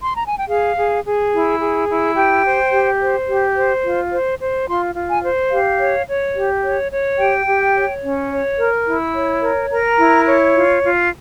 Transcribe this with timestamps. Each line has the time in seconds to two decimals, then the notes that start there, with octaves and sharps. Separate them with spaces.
0.02 C6
0.14 A#5
0.25 G#5
0.37 G5
0.48 G#4 F5
0.77 G#4
1.05 G#4
1.33 E4
1.60 G#4
1.88 E4
2.15 G4 G5
2.44 C5
2.72 G4
3.00 C5
3.27 G4
3.55 C5
3.84 F4
4.11 C5
4.39 C5
4.67 F4 C6
4.96 F4
5.09 G#5
5.23 C5
5.51 G4 F5
5.79 C#5
6.07 C#5
6.34 G4
6.63 C#5
6.91 C#5
7.18 G4 G5
7.46 G4
7.75 C#5
8.03 C#4
8.30 C#5
8.58 A#4
8.86 E4
9.15 C#5
9.42 A#4
9.71 A#4 A#5
9.98 E4
10.27 C#5
10.54 F4
10.82 F4